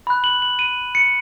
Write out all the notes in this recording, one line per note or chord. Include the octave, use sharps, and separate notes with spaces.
B5 F#6
F#7
F#7
D#7
C#7